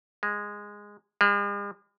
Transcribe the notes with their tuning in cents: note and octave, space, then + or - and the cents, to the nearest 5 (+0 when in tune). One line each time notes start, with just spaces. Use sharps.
G#3 -10
G#3 -45